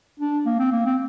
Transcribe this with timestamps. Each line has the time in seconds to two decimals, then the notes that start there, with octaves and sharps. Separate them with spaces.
0.20 D4
0.46 A#3
0.59 C4
0.72 A#3
0.86 C4